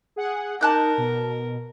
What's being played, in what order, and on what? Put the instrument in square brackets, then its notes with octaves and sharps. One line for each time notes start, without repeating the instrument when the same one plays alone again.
[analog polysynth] G#4 F#5
[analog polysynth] D#4 [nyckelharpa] A#4 [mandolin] A5 F#6 G6
[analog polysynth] B2